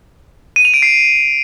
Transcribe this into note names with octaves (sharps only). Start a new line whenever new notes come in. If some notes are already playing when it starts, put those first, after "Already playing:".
D#7
F7
D7
C7